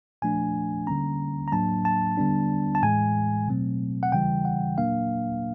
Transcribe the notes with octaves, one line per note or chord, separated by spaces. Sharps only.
A#2 F3 A3 D4 G#5
D3 G3 A#3 C#4 A#5
A#5
A2 F#3 A#3 D4 A5
A5
D3 G3 B3 D4
A5
A2 E3 G#3 G#5
B2 F#3 A3 C4
F#5
C#3 E3 G3 G5
F#5
A#2 F#3 A#3 D4 F5